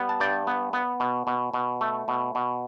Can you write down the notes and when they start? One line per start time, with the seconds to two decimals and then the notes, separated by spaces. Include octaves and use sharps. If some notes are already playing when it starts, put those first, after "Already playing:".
Already playing: G3 B3
0.09 A5
0.20 G2 D5 G5
0.47 B3
0.73 B3
1.00 B2
1.27 B2
1.54 B2
1.81 A3
2.08 B2
2.35 B2